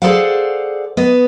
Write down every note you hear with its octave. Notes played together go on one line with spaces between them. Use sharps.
G#4 A4 C5 D5 F5 F#5
B3 D#5